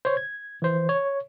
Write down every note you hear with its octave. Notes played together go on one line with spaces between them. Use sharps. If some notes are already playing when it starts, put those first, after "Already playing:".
C5 C#5
G#6
E3 C5
C#5